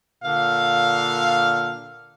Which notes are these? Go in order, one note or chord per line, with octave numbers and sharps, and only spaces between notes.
A#2 D3 F5